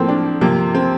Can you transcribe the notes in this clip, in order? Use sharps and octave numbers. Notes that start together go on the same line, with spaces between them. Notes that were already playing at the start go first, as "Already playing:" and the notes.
Already playing: A2 F3 A#3 C4
D4
C3 F3 A#3
C4